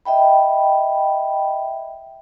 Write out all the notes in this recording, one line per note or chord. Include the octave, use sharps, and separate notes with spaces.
D#5 E5 G5 B5